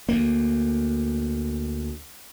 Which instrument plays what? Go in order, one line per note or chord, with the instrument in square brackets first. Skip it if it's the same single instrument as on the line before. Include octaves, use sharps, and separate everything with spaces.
[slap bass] D2 A#3